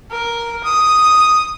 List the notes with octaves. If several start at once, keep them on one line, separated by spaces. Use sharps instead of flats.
A#4
D#6